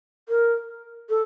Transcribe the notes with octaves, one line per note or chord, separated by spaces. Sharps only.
A#4
A4